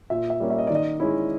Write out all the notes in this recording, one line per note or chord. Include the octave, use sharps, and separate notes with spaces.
A#2 E5
E5
G3 A#3 C#4
E5
D#5
D#3 D5
D#5
G#3 C#4 E4